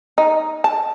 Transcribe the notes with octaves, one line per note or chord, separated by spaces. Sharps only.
D#4
A5